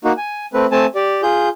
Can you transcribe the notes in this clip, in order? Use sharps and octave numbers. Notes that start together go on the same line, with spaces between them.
A#3 D#4 F#4
G#5
A3 C4 B4
A3 C4 G#5 A5
G4 D5
F4 G#4 G6